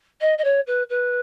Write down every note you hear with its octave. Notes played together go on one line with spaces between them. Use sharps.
D#5
D#5
C#5
B4
B4